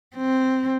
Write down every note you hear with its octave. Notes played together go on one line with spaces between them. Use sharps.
C4